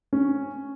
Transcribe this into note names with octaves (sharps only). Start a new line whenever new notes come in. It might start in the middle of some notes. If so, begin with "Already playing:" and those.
C#4